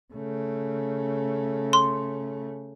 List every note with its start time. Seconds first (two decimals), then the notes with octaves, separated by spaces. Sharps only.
0.13 C#3 A3
1.73 C6